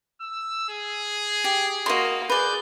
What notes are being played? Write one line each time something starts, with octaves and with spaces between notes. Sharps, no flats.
E6
G#4
G4
A#3 F#4 D#5 C6
G#4 B4 D5 G6